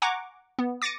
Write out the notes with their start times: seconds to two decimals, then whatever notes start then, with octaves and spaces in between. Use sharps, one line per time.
0.02 F#5 G#5 A#5 C#6 D6
0.59 B3
0.82 D6 A6 A#6 C#7 D#7